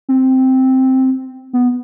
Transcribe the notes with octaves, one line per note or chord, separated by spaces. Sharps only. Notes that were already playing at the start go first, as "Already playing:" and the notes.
C4
B3